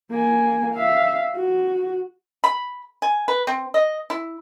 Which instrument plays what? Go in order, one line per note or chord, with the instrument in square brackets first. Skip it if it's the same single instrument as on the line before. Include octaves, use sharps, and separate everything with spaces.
[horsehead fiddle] A#3 G#5
E5 F5
F#4
[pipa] B5
G#5
B4
C4
D#5
E4